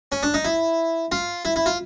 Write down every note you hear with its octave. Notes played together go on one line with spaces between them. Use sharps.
C#4
D4
D#4
E4
F4
E4
E4
F4